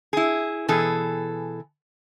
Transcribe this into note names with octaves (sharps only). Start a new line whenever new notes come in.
E4 G#4
B2 E3 G#4 A4